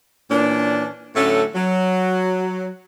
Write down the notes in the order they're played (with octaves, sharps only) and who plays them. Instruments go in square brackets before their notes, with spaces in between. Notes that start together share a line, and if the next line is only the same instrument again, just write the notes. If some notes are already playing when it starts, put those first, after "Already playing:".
[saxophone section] A#2 E3 C#4 D4
A2 D3 F#3 A3 C#4 A4
F#3